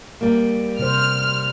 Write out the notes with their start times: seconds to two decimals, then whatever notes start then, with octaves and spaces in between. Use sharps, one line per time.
0.21 G3 A#3
0.79 C3 C5 F6